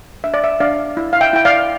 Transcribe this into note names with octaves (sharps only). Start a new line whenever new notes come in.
D4 E5
D5
E5
D4 D5 F5
E4
F5
E5 G5
E4 G5
D5 F5